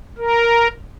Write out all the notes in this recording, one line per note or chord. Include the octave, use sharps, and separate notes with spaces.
A#4